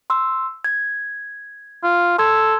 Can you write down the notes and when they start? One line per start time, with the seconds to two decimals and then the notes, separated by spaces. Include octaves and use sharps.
0.10 C6 E6
0.65 G#6
1.83 F4
2.18 A4 C6 E6 G#6